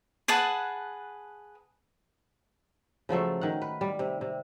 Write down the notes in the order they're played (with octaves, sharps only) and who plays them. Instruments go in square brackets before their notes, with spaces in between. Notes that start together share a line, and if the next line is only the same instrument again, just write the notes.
[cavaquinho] G#4 B4 F#5 A5
[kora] C#3 F3 F#3 A3
D#3 F#5
B4
G3
C3
C3